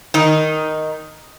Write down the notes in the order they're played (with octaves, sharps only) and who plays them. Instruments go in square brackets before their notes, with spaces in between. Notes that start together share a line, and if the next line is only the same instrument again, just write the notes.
[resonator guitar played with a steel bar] D#3 D#4